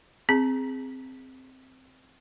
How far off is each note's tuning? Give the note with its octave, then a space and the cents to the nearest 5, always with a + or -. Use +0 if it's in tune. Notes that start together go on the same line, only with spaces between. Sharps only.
C4 +0 G#4 +0 A5 -10